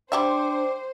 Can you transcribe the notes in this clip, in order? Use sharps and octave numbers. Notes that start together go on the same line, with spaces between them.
G3 D4 G4 C5 D5 E5 G5 D6